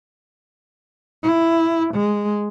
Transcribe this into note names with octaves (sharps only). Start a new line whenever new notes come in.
E4
G#3